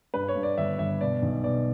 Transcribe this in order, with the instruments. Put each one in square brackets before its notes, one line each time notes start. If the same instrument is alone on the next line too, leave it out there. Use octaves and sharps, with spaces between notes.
[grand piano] G2 [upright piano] B4
[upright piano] C#5
[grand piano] G2
[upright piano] D5
[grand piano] G1 [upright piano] E5
[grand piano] G1 [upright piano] E5
[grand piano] B2 [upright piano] D5
[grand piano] B1
[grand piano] B2 [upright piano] D5